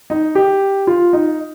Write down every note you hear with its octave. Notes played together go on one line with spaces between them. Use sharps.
D#4
G4
F4
D#4